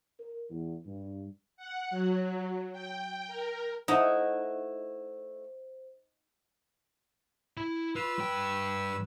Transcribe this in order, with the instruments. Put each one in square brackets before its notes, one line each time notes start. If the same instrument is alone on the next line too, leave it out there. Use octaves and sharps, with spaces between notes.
[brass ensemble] A#4
E2
G2
[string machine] F#5
F#3
G5
A#4
[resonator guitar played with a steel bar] A3 E4 F#5 [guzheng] D#4 [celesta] C5
[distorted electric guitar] E4 B5
[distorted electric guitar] F4 [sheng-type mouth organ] B4 E6
[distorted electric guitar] G2 G5